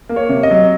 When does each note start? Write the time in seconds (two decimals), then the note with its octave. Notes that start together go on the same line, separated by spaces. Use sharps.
0.09 A#3
0.16 C#5
0.29 C3
0.43 D#5
0.50 F#3